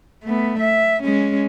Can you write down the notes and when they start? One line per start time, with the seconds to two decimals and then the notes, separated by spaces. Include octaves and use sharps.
0.24 A3 B3
0.60 E5
1.04 G#3 C#4